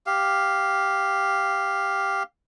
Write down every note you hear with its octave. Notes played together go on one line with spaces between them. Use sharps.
G4 F5